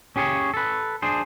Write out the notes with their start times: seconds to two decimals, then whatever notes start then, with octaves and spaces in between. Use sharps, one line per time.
0.16 C#4 G4 G#4 C5 C#5
0.54 A4 B4
1.02 D4 G#4 C5